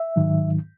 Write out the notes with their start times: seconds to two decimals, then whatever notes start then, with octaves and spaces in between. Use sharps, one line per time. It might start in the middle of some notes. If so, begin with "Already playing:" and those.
Already playing: E5
0.16 G#2 D#3 F#3